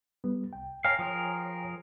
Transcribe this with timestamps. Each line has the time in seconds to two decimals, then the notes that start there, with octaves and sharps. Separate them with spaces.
0.24 G3 B3
0.53 C2 G5
0.85 A#4 C#5 F5 G5 G#5
0.99 F3 G#4 A#4